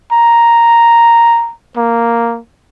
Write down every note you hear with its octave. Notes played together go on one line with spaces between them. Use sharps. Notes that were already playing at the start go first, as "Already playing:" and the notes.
A#5
A#3